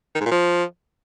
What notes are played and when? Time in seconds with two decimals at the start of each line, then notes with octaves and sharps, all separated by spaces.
0.15 D#3
0.20 G#2
0.26 A#2
0.32 F3